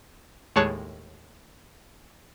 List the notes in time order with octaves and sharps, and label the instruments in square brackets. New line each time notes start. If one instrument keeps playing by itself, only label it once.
[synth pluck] D#2 A2 G#3 C#5 A5 F#6